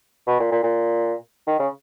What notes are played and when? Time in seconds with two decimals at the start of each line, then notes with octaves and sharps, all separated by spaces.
0.27 B2
0.40 A#2
0.52 A#2
0.63 A#2
1.47 D#3
1.59 C#3